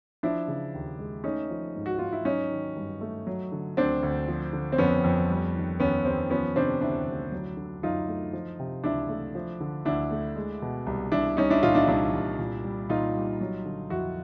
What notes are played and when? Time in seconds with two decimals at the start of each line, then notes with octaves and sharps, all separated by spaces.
0.23 F3 D4 E4
0.48 C#3
0.74 D#2
0.99 G#3
1.24 A3 C#4 D#4
1.50 F3
1.76 G#2
1.86 F#4
1.98 G#2 F4
2.12 E4
2.25 F#3 C#4 D#4
2.51 D#3
2.76 G2
3.01 A3
3.27 F#3
3.52 D3
3.77 D2 C4 D4
4.03 D2
4.28 F3
4.53 D3
4.72 C4
4.78 F2 B3 C#4
5.04 F2
5.29 G3
5.55 D#3
5.80 D#2 B3 C#4
6.05 D#2 C4
6.30 F3 B3 C#4
6.56 C3 C4 D4
6.81 D2 D4 E4
7.06 D2
7.32 F#3
7.57 D3
7.83 F#2 D#4 F4
8.08 A3
8.33 F3
8.59 C3
8.84 C#2 D4 E4
9.09 A3
9.35 F3
9.60 D3
9.85 D2 D4 E4
10.11 A3
10.36 G#3
10.62 B2
10.86 C2
11.12 C2 D4 E4
11.37 G3 C#4 D#4
11.50 D4 E4
11.62 A#2 D#4 F4
11.75 D4 E4
11.83 F4
11.87 C2 D4 E4
12.13 C2
12.39 A#2
12.64 G3
12.89 A#2 D#4 F4
13.15 G3
13.41 F#3
13.65 D3
13.90 F2 E4 F#4